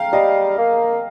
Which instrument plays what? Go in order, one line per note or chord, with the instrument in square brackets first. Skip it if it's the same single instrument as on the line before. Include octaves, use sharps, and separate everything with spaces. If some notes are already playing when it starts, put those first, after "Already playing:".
Already playing: [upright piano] F5 G5 A#5
[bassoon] G3 [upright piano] D#5
[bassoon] A#3